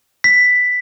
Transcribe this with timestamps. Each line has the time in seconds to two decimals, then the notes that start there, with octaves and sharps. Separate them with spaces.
0.24 B6